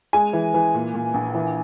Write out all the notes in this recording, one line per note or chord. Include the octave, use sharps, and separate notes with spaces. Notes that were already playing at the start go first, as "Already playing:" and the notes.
G#3 G#5
E3
E3
A#2
A#2
A#1
E3